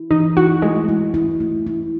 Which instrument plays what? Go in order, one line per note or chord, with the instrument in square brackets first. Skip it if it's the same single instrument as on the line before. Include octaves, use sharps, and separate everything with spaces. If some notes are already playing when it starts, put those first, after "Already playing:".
Already playing: [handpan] E4
[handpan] E3 [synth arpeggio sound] D#4
[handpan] E4 [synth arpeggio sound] F#4
[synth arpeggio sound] G#3 [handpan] A3
[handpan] E4
E4
A3
E4